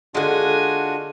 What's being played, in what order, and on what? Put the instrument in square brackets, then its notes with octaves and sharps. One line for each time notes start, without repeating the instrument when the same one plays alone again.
[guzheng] D3 G#3 [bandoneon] D4 F4 F#4 [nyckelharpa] D#5 G#5